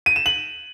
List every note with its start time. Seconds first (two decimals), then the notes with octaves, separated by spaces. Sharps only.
0.06 D#7
0.16 E7
0.26 F#7